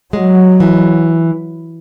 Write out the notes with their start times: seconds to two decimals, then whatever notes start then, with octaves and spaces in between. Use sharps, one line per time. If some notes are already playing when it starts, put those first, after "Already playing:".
0.13 F#3 G#3
0.60 E3